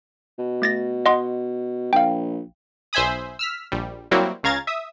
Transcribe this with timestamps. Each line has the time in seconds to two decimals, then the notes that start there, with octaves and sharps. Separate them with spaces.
0.38 B2
0.62 A3 A6 A#6
1.06 D#5 F#5 C6
1.93 A#1 F5 G5
2.93 B1 C5 E5 G#5 B5 D#6
3.39 E6 F6 B6
3.72 A#1 G3
4.11 F#3 G3 A#3 C4 E4 F#4
4.43 C#2 C#3 F5 A#5 G#6 A6
4.67 E5 D#6